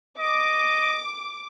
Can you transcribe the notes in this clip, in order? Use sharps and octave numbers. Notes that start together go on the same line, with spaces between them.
D#5 D6